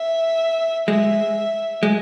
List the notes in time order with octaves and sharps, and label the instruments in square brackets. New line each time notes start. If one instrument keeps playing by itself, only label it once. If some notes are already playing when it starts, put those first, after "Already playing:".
Already playing: [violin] E5
[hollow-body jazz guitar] G#3 [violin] E5
[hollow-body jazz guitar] G#3